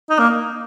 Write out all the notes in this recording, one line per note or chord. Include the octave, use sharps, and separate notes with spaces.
D#4
A#3